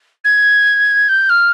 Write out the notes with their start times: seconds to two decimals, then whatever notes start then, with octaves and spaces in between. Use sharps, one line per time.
0.24 G#6
1.08 G6
1.29 F6